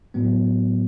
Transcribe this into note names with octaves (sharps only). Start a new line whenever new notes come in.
A2 F#3 B3